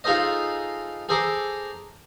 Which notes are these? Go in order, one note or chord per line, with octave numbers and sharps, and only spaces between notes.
D#4 F4 G#4 A4 C5 D#5
G#4 A4 C5 A#5 D6